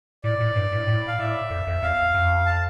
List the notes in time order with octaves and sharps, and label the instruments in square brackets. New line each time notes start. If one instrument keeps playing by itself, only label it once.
[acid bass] A2 [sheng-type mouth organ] D5
[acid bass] A2
G2
A2
A2
[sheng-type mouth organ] F5
[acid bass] A2 [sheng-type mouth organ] E5
[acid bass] F2
F2
[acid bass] E2 [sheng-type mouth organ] F5
[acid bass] F2
[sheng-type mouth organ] A5